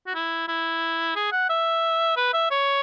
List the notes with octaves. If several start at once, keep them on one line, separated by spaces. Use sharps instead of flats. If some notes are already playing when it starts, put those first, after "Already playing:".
F#4
E4
E4
G#4
F#5
E5
B4
E5
C#5